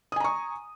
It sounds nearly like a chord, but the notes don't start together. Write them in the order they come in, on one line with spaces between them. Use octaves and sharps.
D#6 G#5 A#5 C#6